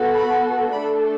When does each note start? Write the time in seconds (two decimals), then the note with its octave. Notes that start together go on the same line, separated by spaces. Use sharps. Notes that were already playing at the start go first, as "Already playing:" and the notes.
Already playing: B3 F#4 A4
0.14 B5
0.71 A3 D4 A4 B5